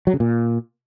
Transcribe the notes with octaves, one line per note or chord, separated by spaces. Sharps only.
F#3
C#3
A#2